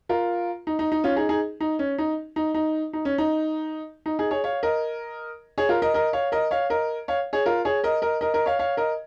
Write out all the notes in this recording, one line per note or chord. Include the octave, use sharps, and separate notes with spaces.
F4 A#4
D#4
D#4
D#4
C#4 F4
D#4 G#4
D#4 G#4
D#4
C#4
D#4
D#4
D#4
D#4
C#4
D#4
D#4
D#4 G#4
G#4 C#5
C#5 F5
A#4 D#5
G#4 C#5
F4 A#4
A#4 D#5
A#4 D#5
C#5 F5
A#4 D#5
C#5 F5
A#4 D#5
C#5 F5
G#4 C#5
F4 A#4
G#4 C#5
A#4 D#5
A#4 D#5
A#4 D#5
A#4 D#5
C#5 F5
C#5 F5
A#4 D#5